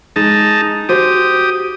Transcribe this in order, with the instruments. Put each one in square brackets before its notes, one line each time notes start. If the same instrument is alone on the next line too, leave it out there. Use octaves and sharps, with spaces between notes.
[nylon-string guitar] G#3 [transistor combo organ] D#4 A5
[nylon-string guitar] F#4 C5 [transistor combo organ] G4 D#6